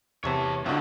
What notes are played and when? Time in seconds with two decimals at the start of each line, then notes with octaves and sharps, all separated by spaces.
0.24 E2 C3 E3 C#5 A5
0.66 C#2 D3 F3 F#4 E5